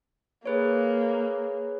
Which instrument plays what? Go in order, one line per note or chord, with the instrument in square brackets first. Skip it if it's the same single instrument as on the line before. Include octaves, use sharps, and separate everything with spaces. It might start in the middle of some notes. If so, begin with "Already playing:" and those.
[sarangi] A#3 [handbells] G#4 B4 C#5